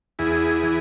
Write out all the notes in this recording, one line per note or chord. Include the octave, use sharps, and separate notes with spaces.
E2 E4 G#4
E3